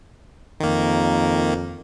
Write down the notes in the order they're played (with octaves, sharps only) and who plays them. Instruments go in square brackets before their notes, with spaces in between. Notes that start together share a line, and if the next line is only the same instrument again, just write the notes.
[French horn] F2 [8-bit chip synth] D#3 A#3